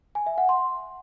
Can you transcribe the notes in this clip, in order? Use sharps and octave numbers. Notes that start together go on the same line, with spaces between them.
G#5
E5
F#5
C6